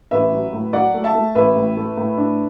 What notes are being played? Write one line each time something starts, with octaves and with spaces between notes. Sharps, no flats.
A1 B4 E5
F#3
A2
F#3 D5 F#5
A3
E5 A5
A3
A1 B4 E5
A2
A3
A2
D4